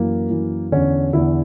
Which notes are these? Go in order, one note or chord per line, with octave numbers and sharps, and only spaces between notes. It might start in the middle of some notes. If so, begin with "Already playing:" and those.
Already playing: F#2 E3 A#3
F#2 E3
E2 D3 C#4
E2 D3 E4